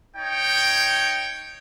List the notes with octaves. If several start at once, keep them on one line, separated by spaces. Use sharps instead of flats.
D#4 C#5 G5